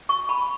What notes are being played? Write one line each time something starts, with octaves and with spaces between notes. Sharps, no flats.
C#6
B5